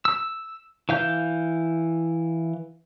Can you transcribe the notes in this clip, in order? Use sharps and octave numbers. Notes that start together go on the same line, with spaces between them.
E6
E3 F5 G6